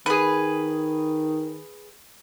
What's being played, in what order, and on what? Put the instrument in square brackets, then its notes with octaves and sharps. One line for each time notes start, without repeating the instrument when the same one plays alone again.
[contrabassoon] D#3 [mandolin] G#4 B4